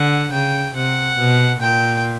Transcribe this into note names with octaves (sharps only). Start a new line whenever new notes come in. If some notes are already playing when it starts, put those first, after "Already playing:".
Already playing: D3 F#5
C#3 G5
C3 F#5
B2
A#2 G5